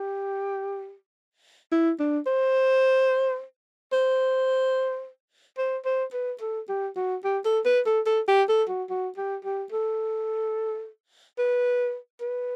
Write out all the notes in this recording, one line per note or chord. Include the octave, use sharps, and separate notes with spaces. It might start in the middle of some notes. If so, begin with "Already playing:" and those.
Already playing: G4
E4
D4
C5
C5
C5
C5
B4
A4
G4
F#4
G4
A4
B4
A4
A4
G4
A4
F#4
F#4
G4
G4
A4
B4
B4